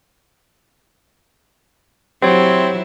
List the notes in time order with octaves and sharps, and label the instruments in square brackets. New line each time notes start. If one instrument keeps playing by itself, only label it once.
[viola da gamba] F#3 E4 [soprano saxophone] C4 [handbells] G4 C#5